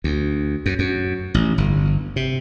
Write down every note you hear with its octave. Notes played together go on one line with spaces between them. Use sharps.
D2
F#2
F#2
A1
G1
C3